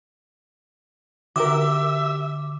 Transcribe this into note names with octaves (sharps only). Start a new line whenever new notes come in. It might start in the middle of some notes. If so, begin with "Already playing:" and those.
D3 F#4 G4 A#4 E5 D6